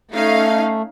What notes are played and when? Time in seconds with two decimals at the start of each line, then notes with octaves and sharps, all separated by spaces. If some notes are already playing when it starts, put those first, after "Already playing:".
0.12 A3 C#4 D#4 F5